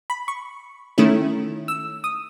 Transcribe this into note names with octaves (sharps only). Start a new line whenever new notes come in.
B5
C#6
D#3 A3 C#4 E4
E6
D#6